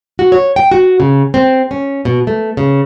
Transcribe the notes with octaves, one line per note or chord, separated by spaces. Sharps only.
F#4
C#5
G5
F#4
C#3
C4
C#4
B2
A3
C#3